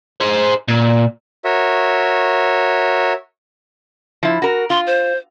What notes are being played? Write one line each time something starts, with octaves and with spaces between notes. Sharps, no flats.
G#4 C5
A#2
F#4 A#4 C#5 E5
F3 E4
F#4 A#4
F4 C6
C5